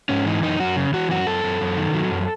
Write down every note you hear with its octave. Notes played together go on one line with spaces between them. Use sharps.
G#2 C#4
E3 D#4
F#2 D#4
F#2 F#4
C#3
E3 F#4
F#2 F#4
F#2 A4
F#2
F#2
D#3
F#3
F#2